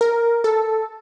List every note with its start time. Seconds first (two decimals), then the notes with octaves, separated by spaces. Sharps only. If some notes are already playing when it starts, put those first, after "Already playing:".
0.01 A#4
0.44 A4